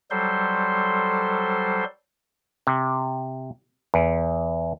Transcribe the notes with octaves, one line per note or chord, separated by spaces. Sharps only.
F#3 G3 A4 C5 C6
C3
E2